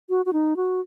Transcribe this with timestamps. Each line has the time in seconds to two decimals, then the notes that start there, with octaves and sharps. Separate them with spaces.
0.09 F#4
0.26 F#4
0.33 D#4
0.56 F#4